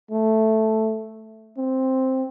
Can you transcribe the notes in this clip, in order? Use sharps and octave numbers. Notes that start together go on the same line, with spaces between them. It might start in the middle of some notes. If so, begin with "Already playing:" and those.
A3
C4